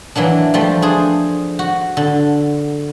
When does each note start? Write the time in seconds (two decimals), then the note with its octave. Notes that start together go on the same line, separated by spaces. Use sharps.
0.15 E3 F#3 A#3 D4
0.54 F3 G3 A3
0.82 D4 G#4 C5
1.59 F#4
1.97 D3